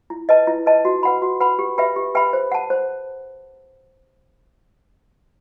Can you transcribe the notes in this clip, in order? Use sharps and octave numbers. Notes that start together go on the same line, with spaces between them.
E4
B4 D#5 A5
E4
B4 D#5 A5
F#4
B4 F#5 B5
F#4
B4 F#5 B5
G4
B4 E5 G5 B5
G4
B4 E5 G5 B5
C5
F#5 A5
C5